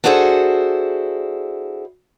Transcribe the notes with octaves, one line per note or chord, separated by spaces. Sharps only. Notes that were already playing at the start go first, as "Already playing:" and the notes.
D4 E4 F#4 G#4 A4 C5